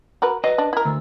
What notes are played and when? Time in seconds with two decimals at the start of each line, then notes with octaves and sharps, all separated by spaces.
0.22 F#4 A#4 B4
0.44 F#3 B4 D#5
0.58 D4
0.73 E4 A#4
0.85 D2 E6